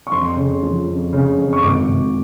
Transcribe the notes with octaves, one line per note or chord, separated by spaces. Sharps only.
C#6
F2 C6
C#3
F3
F2
C#3
F2
C#6
G#1 D6
G#1